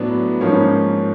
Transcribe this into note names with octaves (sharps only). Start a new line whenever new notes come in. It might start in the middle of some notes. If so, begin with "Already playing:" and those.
Already playing: A2 F#3 B3 D4
G#2 F3 A#3 C#4